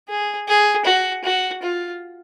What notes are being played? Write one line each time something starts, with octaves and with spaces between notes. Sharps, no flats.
G#4
G#4
F#4
F#4
F4